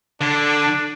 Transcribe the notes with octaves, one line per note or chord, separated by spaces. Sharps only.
D3 D4